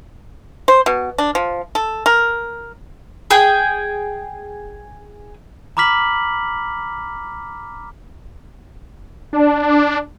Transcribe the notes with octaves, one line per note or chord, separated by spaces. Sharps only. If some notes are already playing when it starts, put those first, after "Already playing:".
C5
B2
D4
F3
A4
A#4
G#4 G5
A#5 B5 D6 F6 B6 F#7
D4